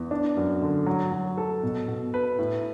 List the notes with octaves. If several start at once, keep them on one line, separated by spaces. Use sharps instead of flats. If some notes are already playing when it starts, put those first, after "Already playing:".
Already playing: E2
D4
F#2
D3
F#3
F#3
A4
B2
B2
B4
A2